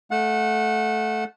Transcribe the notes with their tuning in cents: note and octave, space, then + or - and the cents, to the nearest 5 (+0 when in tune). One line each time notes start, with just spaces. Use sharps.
A3 -15 F#5 -25